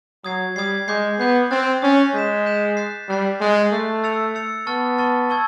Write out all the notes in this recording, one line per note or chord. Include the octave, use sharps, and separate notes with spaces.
F#3 D#6 G#6 C7
G3 D#6 G#6 C7
G#3 D6 G6 C7
B3 D6 G6 C7
C4 D#6 F#6 A6
C#4 D#6 F#6 A6
G#3 G6 B6 E7
G6 B6 E7
D#6 F#6 A6 C7
G3 D#6 F#6 A6 C7
G#3 D#6 F#6 A6 C7
A3 D#6 F#6 A6 C7
E6 A6 C#7 F7
E6 A6 C#7 F7
B3 A5 C#6 F6 A6
A5 C#6 F6 A6
A5 C#6 E6 G#6